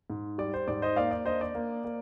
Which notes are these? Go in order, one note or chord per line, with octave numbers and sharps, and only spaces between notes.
G#2
G3 D5
C5
G#2 D5
C5 D#5
A#3 D5 F5
D5
D4 C5 D#5
D5
A#3
A#3